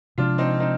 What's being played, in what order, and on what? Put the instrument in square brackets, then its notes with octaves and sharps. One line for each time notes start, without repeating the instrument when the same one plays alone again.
[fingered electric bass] C3 F3 G#3 [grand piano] D4 F4
[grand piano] C4 D#4
C4 D#4